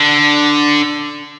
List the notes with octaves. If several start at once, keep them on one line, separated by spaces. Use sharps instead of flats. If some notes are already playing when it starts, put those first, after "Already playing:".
Already playing: D3